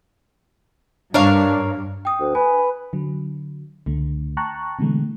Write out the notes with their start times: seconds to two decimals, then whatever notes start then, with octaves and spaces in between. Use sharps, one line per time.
1.14 G2 D4 A#4 C#5 F5
2.05 G5 D#6
2.20 D2
2.35 B4 G#5
2.93 D3 F#3
3.86 C#2 D3 A3
4.37 G5 A5 A#5 C#6 F#6
4.79 B2 D3 E3 G#3 A3